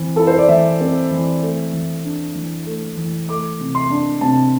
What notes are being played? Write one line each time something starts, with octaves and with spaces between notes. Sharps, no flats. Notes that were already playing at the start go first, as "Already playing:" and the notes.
Already playing: E3 C4
E4 A4
C5
D5
E3 E5
C4
E3
A3
E3
D4
E3
A3
E3
A3 D6
C3
C6
D4
C3 A5